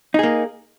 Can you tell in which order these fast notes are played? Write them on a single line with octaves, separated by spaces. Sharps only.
D#4 G#4 A#3